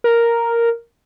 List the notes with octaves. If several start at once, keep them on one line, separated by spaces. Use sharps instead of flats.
A#4